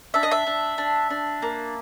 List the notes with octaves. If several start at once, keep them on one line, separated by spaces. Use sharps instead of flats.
D4 E5
D#5
E5
D4
D4
D4
A#3